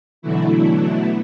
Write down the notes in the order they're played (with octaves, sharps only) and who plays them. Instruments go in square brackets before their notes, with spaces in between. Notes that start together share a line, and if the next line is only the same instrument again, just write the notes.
[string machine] B2 D3 E3 F#3 A3 E4